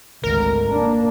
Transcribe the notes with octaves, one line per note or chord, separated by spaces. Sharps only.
G#1 D2 A#4
A#3 D4